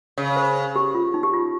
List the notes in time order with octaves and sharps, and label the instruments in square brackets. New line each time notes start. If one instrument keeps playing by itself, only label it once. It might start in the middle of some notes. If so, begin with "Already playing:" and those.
[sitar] C#3 [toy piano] C#5
[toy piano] C5
G4
F4
D#4
G4
F4